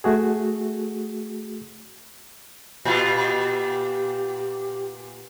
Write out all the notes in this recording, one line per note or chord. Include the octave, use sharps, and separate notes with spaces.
A3 F#4 G#4
A#2 B3 F4 G4